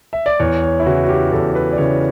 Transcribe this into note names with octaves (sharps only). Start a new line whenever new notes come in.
E5
D5
E2 C#5
C#5
E4
C#3 E3 F#4
F#4
G4
E2 A4
B4
D5
C#3 E3 C#5